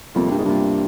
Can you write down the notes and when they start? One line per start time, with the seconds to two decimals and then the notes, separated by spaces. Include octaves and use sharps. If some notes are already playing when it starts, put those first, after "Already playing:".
0.15 F2 C3 G3 A#3 F4
0.31 G2
0.38 G#2
0.44 G2 C3 G3 A#3 F4